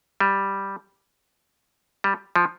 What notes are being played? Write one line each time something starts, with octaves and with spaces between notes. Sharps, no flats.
G3
G3
F3